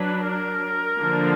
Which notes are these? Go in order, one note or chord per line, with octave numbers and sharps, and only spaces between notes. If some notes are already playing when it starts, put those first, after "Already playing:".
Already playing: F#3 D4 B4
A#4
D3 F3 A#3 D4